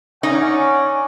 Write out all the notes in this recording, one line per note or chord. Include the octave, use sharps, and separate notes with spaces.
C#4 D#4 C#5 D5 F#5